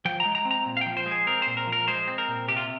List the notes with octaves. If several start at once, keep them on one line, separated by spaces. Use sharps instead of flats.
F3 G5
A#5
G#3
A#5
C4
A#5
A#2
F5
F3 G5
C5
G#3
G#4
C4 A#4
A#2 C5
A#4
F3
A#4
G#3 C5
C4
A#4
A#2
C3 G4
F4